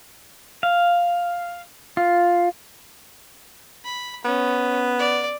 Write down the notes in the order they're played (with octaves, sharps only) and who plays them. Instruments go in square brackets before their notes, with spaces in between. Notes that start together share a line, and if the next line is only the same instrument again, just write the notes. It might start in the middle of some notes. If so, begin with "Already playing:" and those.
[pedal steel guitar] F5
F4
[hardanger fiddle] B5
[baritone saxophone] B3 [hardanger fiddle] C#4
[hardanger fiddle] D5